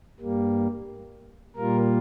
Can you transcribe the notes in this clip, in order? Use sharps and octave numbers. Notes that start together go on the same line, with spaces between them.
G2 G3 A#3
A#2 G3 A#3 F4 A#4